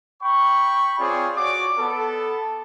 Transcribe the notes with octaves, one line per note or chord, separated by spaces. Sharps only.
G5 B5 C#6
C4 F4 G#4 C#5 D5
F#4 C#5 D5 D6
B3 A4